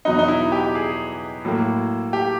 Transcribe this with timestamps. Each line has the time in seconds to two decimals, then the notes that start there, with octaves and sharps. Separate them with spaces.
0.05 E2 B2 F#3 B3 D#4
0.19 D#4
0.28 E4
0.52 G4
0.75 G#4
1.45 A2 F#3 A#3
2.13 G4